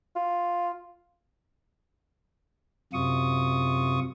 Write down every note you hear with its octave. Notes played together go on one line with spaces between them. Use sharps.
F4
F#2 C3 F4 C#6 D#6